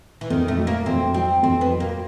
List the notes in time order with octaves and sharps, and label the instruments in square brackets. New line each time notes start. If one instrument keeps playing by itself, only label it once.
[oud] E3
[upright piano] F2 [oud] D#3
[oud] A3
[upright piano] F#3
[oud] A#3
[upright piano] F2 [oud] C4
[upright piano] F#3 [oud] C4
[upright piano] F2 [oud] C4
[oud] B3
[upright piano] F#3
[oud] A#3